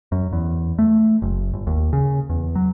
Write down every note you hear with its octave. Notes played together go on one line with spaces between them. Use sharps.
F#2
E2
A3
F#1
G1
D#2
C#3
E2
F#3